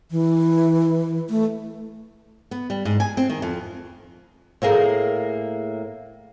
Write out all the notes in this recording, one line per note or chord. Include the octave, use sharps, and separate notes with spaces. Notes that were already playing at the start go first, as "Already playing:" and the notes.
E3
A3
B3
G3
G#2
G#5
C4
D#3
F2
A2 A#3 G#4 A#4